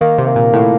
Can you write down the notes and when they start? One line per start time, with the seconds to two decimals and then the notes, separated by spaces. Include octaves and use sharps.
0.01 D#3 A#3
0.18 C3
0.27 A#3
0.36 A#2
0.54 A2